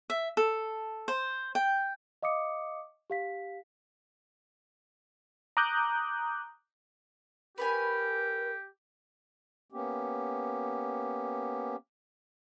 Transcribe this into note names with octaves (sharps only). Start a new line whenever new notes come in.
E5
A4
C5
G5
D#5 F5 D6 D#6 C#7
G4 F5 B6
A#5 D6 D#6 F#6 G6
G4 A#4 B4 C#5 G#5
A#3 B3 C#4 G4